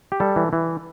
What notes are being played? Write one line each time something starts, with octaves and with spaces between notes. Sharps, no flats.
G4
G3 A4
E3
E3